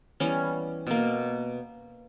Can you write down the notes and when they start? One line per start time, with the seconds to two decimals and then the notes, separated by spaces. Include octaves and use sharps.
0.20 E3 G3 B3 C#4
0.87 B2 A#3